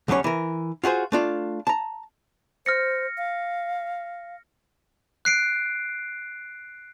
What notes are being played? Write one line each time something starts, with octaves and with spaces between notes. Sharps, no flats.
D2 F#3 G3 C#4 C#5
E3 A#4
F4 F#4 G#4 C5
A3 D4 F4
A5 A#5
C5 F6 A#6 C#7
F5
F#6 C7 D7